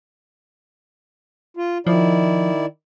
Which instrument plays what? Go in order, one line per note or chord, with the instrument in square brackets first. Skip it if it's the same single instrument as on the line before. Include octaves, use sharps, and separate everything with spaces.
[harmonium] F4
[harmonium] D#3 E4 D5 [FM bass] F3